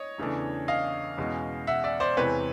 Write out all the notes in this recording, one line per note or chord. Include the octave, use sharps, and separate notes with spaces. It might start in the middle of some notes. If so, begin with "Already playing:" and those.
Already playing: C#5 D#5
E2 C#3 E3 A3 D4
D#5 F5
E2 B2 G#3 C#4
E5 F#5
D5 E5
C5 D5
E2 C3 E3 G#3 C4 B4 C#5